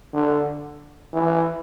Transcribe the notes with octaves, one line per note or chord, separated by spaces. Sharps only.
D3
E3